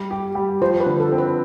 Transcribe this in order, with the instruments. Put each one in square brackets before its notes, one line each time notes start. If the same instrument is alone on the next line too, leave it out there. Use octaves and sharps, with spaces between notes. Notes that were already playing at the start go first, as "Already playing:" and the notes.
Already playing: [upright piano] G3
G4
G3
[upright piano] F3 [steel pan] C5
[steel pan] B4
[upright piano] D3
[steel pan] A4
[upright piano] C4
[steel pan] B4